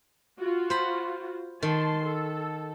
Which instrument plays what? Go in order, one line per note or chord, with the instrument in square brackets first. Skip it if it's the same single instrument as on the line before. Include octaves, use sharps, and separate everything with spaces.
[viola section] F4 F#4
[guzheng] C5 B5
[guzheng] D#3 [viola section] A5 C6
[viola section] A4